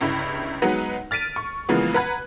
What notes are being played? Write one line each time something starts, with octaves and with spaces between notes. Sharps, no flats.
G1 C#2 G2 E4
F#3 G#3 B3 D#4 B4 F#5
F6 A6 B6 D7 D#7
C#6
C#3 E3 F3 G#3 A#3 B3
B4 F#5 A#5 B5 F#6 G#6